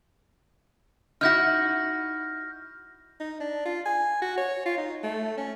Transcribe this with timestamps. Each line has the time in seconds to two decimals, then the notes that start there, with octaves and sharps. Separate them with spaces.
1.21 D#4 E4 F#4 F6 G6 A#6
3.20 D#4
3.40 D4
3.65 F4
3.86 G#5
4.22 F#4
4.38 C#5
4.66 F4
4.78 D#4
5.03 A3
5.37 C#4